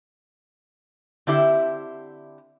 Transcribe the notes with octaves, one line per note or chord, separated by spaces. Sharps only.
D3 C4 E4 G4 E5